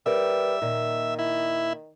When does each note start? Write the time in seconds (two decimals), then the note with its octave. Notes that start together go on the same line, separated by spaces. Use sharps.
0.06 G3 A#4 B4 E5 G5
0.62 A#2 D#3
1.19 E4